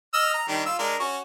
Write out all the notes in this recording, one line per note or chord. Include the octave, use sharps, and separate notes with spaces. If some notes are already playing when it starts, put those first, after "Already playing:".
D#5 E6 F6
A#5
D#3 G3 D4
F4 E6
G#3 D4 A#4
C#4 F#4